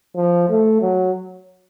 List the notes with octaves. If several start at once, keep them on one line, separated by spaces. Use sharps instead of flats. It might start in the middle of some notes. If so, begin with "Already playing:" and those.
F3
A3
F#3